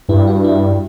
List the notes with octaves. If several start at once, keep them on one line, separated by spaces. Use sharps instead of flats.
G2 E4
F#4
E4